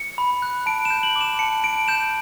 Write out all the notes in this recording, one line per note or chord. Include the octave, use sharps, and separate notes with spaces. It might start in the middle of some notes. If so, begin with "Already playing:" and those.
Already playing: C#7
B5
F#6
A5 D7
E7
G6
F#7
D6
E7
A5 C#7
A5 D7
G6 E7